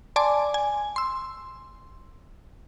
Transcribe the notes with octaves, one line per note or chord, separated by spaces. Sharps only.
D5 G#5 A5 C6 D6
G#5
C6 E6